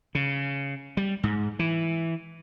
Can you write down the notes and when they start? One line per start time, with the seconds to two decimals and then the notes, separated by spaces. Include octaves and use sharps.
0.15 C#3
0.97 G3
1.23 G#2
1.59 E3